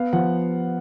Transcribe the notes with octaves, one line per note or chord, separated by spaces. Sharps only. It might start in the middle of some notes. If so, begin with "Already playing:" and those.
Already playing: B3 F5
F3 F#5